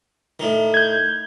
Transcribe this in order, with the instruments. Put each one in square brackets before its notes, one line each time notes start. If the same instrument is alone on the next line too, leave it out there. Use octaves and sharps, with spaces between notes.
[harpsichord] A2 D#3
[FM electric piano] G6 G#6